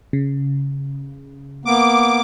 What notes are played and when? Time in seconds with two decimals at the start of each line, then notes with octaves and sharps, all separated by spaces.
0.13 C#3
1.65 A#3 B3 D6